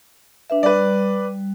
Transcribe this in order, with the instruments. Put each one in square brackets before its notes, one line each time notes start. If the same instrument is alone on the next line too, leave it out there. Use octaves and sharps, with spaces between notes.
[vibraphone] D4 B4 E5
[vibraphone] G3 [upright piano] B4 D5